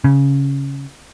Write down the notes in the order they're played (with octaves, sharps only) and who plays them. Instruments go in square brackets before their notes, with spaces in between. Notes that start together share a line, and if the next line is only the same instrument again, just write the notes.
[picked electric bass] C#3